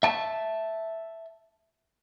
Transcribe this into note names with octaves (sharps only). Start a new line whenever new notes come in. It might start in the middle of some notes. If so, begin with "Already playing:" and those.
E5 A5